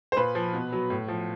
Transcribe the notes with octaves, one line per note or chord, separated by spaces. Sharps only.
C5
A#2 B4
F3
B2
F#3
A2
F3